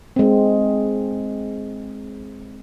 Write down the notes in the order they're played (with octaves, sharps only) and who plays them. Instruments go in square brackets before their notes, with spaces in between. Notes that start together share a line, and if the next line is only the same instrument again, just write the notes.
[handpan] G#3 C4